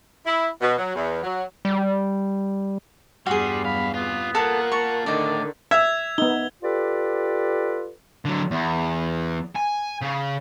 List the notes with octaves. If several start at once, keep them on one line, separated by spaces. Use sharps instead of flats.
E4
B2
F#3
E2
F#3
G3
E2 G2 G3 F#4 G#4 C6
F#2 F5 B5
C3 B3 F4
A#3 F4 A4 A#4 F#5 A5
A5 C#6
A2 D3 D#3 D#4 D5
E5 E6 G#6 F7
B3 D#4 G7
F4 G4 A4 B4 D5
D3 F#3
E2
G#5
C#3